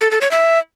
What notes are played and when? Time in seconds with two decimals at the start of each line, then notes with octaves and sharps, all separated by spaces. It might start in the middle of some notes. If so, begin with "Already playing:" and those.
0.01 A4
0.11 A4
0.21 C#5
0.31 E5